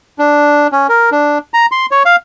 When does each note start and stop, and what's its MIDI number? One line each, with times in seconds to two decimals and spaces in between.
0.19 0.67 62
0.72 0.87 61
0.89 1.10 70
1.12 1.38 62
1.54 1.66 82
1.72 1.86 84
1.91 2.03 73
2.05 2.16 77